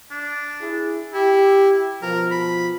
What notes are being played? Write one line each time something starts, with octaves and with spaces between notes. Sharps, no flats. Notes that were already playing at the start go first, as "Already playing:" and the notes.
D4
E4 G#4
E4 G4
B2 F3 A#4
B5